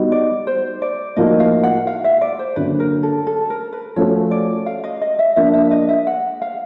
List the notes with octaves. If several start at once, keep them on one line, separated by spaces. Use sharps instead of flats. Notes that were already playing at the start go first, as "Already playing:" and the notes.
Already playing: G3 B3 D#4 F#4
D5
C5
D5
A2 F3 A#3 D#4 F#4 D#5
F5
F#5
F5
E5
D5
C5
D3 F#3 A#3 C#4 B4
A#4
A4
A4
A#4
B4
F3 A3 C#4 F#4 C#5
D5
F5
D#5
D#5
E5
F3 A#3 D4 E5
E5
D#5
E5
F#5
F5